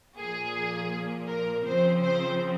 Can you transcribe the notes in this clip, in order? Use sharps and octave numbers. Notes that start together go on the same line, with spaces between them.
A#2 F3 A#3 G#4
A#4
C#3 F3 C4 C5
C5